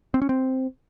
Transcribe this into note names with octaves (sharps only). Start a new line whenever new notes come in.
C4
C#4
C4